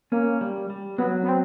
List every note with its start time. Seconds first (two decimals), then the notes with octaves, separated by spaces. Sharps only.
0.12 A#3 C#4
0.41 G3
0.70 G3
0.98 F#3 B3
1.23 B3
1.29 C4